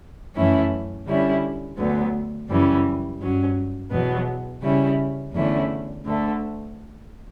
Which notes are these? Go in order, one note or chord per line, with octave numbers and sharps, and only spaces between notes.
F#2 E3 A3 C#4 E4
D3 G3 C#4 E4
D2 D3 F#3 B3
F#2 C#3 E3 G3 C#4
G2 F#3 C#4
E2 B2 F#3 B3
C#3 G3 C#4 E4
E2 D3 A3 C#4 E4
D2 D3 A3